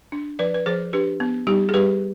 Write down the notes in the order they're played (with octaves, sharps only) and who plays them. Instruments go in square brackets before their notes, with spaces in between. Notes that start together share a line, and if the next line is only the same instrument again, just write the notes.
[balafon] D4
F3 B4 D5
B4
F3 G#4 C5
D4 G4 B4
B3
G3 D#4 G4
G#4
G3 G4 B4